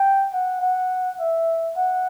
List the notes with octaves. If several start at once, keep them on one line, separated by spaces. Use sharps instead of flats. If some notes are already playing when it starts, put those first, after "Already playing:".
Already playing: G5
F#5
F#5
E5
F#5